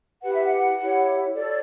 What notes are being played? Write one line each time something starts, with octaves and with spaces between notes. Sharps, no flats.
E4 G4 B4 F#5
E5
F#5
E4 G4 C#5
F#4 A4 C#5 D5